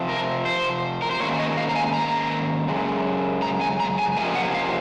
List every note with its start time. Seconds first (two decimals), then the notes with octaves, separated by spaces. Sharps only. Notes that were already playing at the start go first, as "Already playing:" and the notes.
Already playing: C3 F3 C4
0.09 A#4
0.45 C5
1.02 A#4
1.11 C5
1.20 G#2 D#3 A#3 C#4 C#5
1.39 D#5
1.57 F5
1.69 A#5
1.76 G#5
1.94 A#5
2.68 F#2 C#3 G#3
3.42 A#5
3.61 G#5
3.80 A#5
3.99 G#5
4.17 F2 C3 F3 A#3 C#4 G#5
4.35 F#5
4.54 F5